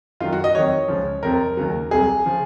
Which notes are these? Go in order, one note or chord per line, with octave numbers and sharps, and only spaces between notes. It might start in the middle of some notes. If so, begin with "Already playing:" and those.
F#2 D#3 F#3 F4
F#4
D#5
F2 D#3 F#3 C#5
C#2 C#3 F3
F2 C3 F3 A#4
D#2 C#3 F#3
C2 C3 F#3 G#4
C#3 F3